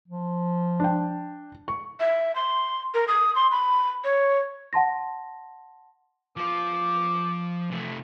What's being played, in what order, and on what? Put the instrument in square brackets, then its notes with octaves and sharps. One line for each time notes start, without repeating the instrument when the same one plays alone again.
[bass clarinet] F3
[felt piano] D4 G5
C#6
[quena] E5
C6
A#4
D#6
C6
B5
C#5
[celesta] F#5 A5 C6 A#6
[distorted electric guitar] F3 F4 [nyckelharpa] D6
[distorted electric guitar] C3 A3